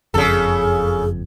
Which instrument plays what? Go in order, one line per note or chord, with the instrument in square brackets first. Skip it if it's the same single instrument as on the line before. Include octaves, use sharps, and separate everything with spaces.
[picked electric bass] F#1 F2 [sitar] C#3 A4 [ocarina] G#4